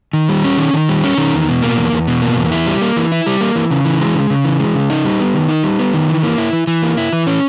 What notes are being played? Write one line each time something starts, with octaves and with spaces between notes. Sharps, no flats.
D#3
G3
C#4
D#3
D#3
G3
C#4
D#3
E2
B2
A#3
E2
E2
B2
A#3
E2
E4
G3
A#3
E3
E4
G3
A#3
E3
C#3
E3
G#3
C#3
C#3
E3
G#3
C#3
D#4
G3
B3
D#3
D#4
G3
B3
D#3
E3
A#3
E4
E3
E3
A#3
E4
E3
C#4